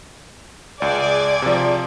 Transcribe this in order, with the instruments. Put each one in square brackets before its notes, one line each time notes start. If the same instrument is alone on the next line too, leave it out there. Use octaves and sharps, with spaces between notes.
[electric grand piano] C#2 [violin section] G#4 D5 G#6
[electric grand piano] C3 F3